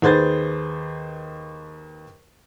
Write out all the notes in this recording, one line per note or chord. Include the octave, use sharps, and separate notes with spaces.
D#2 G#4 B4 C5 G#6 A6